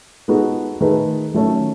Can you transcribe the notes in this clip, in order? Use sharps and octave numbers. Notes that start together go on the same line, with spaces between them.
G#3 B3 D#4 F#4 A4
D#3 A3 D#4 G#4 B4
D#3 F#3 A3 C#4